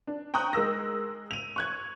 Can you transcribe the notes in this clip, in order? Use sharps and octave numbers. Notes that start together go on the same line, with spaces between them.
D4
G5 A#5 C#6 D#6 F#6
G#3 A#4 E6 A#6
D#7 F7
C#6 F#6 G#6